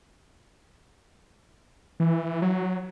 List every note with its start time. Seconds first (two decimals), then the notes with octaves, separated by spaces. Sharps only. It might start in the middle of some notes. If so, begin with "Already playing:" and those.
2.00 E3
2.42 F#3